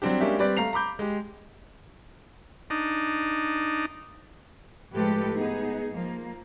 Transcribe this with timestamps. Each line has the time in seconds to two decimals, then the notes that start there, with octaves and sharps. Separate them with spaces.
0.02 F#3 G3 C4 D4 G4
0.21 G#3 A#3 C#4 D4 G4 E5
0.39 G3 C4 B4 D5
0.57 A3 F5 A#5 C7 F7
0.73 A#5 B5 D6 G6
0.99 G#3 G4
2.70 D4 D#4
4.94 A2 F3 G#3 G4 A4 B4
5.36 B3 D#4 G#4
5.91 F3 A#3